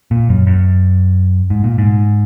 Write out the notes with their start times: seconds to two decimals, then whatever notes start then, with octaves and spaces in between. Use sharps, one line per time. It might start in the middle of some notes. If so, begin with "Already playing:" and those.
0.11 A#2
0.29 F#2
0.47 F#2
1.50 G#2
1.64 A#2
1.78 G#2